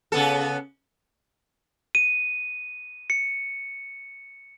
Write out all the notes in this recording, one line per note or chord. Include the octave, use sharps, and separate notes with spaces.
C#3 B3 A4
D#7
C#7